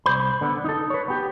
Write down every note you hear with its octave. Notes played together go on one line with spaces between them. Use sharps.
C2 C5 B5
D3 B3
D#4 A4
B4 C#5
B3 G4